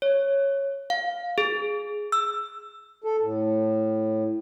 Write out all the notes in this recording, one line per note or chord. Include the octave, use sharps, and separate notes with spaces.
C#5
F5
G#4
E6
A4
A2